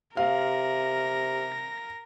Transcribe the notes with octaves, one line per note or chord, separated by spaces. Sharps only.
C3 A#4 F5 A#6